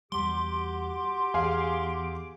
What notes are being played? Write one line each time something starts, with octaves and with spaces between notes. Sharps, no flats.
E2 G3 F#4 G4 C6 D6
E2 G#4 F5 G#5